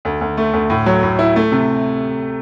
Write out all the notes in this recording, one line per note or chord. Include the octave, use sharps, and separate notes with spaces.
D2
D2
A3
D2
A2
F#3
A2
E4
A3
C3